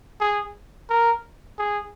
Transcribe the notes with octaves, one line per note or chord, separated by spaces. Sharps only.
G#4
A#4
G#4